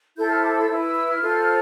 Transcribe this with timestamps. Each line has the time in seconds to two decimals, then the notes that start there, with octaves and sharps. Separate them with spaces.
0.17 E4 A4 C5 G6
0.29 F6
0.43 D6
0.56 E6
0.69 E4 B4
0.82 E6
0.95 E6
1.08 F6
1.21 F4 A4 C5